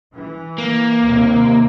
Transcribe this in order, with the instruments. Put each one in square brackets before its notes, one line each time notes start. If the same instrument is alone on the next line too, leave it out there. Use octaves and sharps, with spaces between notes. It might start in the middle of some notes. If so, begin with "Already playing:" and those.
[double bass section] E3
[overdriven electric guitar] A#3
[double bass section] D#2 C3